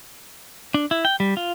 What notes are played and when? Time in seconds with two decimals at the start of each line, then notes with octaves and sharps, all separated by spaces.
0.74 D4
0.91 E4
1.05 G5
1.20 G3
1.37 F4